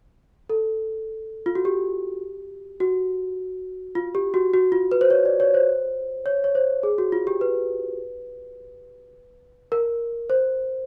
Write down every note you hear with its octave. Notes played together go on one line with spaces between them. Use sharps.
A4
F4
F#4
G4
F#4
F4
G4
F#4
F#4
F4
B4
C5
C#5
D5
C#5
C5
C#5
C#5
C5
G#4
F#4
F4
G4
B4
A#4
C5